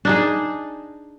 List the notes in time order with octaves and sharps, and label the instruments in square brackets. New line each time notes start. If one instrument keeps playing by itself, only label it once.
[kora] D4 D#4 G#4